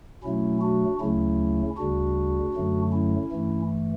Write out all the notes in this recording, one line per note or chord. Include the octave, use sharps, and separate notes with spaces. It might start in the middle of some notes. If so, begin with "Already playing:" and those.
B2 F#3 A3 C#4 E4
D4 F#4
D2 C#3 F#3 A3 C#4 E4
D2 C#3 G3 D4 F#4
F#2 D3 F#3 A3
C#4 E4
G2 E3 A3